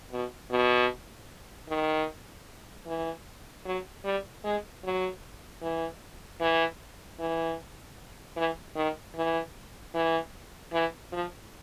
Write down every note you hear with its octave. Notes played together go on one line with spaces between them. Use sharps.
B2
B2
D#3
E3
F#3
G3
G#3
F#3
E3
E3
E3
E3
D#3
E3
E3
E3
F3